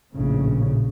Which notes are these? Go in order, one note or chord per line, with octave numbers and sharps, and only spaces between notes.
A#1 A2 C#3